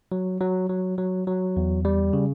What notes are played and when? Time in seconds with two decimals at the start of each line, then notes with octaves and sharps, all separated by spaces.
0.12 F#3
0.41 F#3
0.69 F#3
0.98 F#3
1.27 F#3
1.57 E2
1.85 G3
2.13 C#3